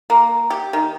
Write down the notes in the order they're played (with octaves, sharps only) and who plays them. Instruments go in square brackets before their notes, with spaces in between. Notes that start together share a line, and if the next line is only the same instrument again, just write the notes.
[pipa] A#3
G4
D#3